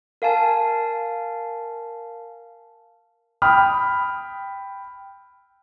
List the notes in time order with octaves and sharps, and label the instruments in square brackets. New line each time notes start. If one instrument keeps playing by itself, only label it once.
[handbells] A#4 F5 G#5 A5
[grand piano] G5 B5 D#6 F6